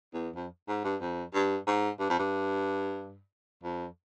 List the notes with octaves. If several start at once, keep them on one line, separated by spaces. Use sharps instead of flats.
E2
F2
G#2
G2
F2
G2
G#2
G2
F2
G2
F2